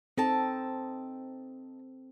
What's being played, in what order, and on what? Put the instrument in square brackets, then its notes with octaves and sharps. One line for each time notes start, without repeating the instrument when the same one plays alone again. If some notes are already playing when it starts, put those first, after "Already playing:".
[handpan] C4 A4 [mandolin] D#4 G5 A5